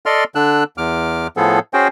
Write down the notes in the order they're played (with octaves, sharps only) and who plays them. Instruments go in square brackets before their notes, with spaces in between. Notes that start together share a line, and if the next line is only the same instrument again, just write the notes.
[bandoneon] A4 D5 D#5 C6 F6
D3 D4 E6 F#6
E2 D6 F6
A2 F3 B3 G#4 A4
C#4 F#4 G#4 C5 G5